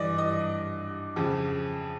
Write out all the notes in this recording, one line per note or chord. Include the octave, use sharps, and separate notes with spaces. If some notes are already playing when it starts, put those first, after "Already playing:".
Already playing: G2 E3 D5 D#5
D#5
F2 C#3 F3